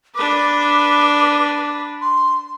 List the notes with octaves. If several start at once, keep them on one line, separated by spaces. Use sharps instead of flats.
D4 B4 D6
C6